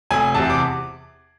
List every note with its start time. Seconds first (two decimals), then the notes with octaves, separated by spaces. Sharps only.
0.11 F1 G#5
0.35 E2 C3 A5
0.50 D6